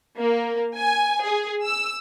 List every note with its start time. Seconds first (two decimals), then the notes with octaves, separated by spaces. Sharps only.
0.19 A#3
0.75 G#5
1.25 G#4
1.65 E6